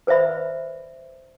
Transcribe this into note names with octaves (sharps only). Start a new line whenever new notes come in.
B4 C5 D5 E5 B5